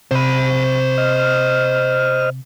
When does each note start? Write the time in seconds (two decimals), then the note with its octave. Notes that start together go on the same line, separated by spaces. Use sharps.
0.11 C3 C5 B5
0.98 D#5 F6